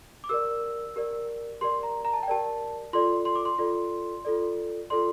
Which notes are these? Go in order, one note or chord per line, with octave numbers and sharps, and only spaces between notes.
D6
G4 A#4 D5 E6
G4 A#4 D5
G4 A#4 D5 C6
A#5
A#5
A5
G5
G4 A#4 D5 A5
F4 A4 D5 C6
C6
D6
C6
F4 A4 D5
F4 A4 D5
F4 A4 D5 C6